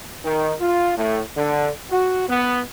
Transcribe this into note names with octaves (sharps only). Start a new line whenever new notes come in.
D#3
F4
A2
D3
F#4
B3